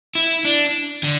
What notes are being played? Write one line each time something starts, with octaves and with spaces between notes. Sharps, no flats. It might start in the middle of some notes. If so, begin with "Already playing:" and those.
E4
D4
D3